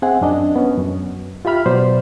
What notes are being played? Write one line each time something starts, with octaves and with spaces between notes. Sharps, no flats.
C4 G#4 E5 F#5 G#5
F#2 D4 D#5
B3 C#4
F#2
F4 G4 E5 B5 F6
B2 F#3 C5 D5